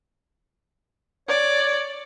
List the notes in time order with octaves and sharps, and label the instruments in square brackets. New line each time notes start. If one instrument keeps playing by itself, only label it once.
[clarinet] C#5 [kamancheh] D5